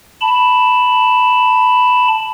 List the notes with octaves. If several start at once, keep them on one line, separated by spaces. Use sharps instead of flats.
A5 B5